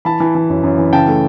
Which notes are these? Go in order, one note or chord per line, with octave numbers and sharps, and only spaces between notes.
E3 A5 B5
E3
E3
F#2
F#2
E3
C#3 G5 A5
A3